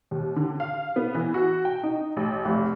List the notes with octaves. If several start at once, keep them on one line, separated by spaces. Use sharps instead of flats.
D#2
D3
F5
B3
E3
F#4
G5
D#4
A1
F1